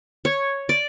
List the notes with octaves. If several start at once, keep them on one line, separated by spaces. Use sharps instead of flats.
C#5
D5